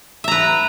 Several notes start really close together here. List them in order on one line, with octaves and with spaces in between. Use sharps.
E5 A#5 B4